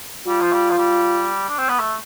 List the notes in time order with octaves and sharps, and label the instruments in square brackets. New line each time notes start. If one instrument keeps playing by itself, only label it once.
[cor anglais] G3 [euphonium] F4
[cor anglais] F3
G3
F3
G3
D4
C4
B3
A3